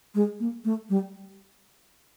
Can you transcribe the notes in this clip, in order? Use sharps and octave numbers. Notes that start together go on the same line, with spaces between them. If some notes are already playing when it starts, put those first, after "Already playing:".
G#3
A#3
A3
G3